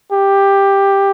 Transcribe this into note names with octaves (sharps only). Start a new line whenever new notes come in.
G4